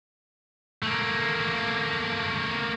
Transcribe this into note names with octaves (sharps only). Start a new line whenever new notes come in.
A3 A#3